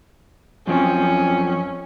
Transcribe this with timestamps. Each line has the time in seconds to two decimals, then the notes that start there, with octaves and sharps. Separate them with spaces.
0.67 F#2 F3 C4 C#4